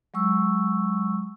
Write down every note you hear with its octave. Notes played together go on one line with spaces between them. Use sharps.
F#3 G#3 C#6 E6